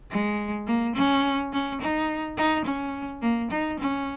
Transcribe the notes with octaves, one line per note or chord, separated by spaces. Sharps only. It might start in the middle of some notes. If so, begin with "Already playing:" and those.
G#3
A#3
C#4
C#4
D#4
D#4
C#4
A#3
D#4
C#4